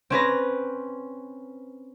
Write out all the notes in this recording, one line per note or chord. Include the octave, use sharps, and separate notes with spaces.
C4 C#4 B4 A#6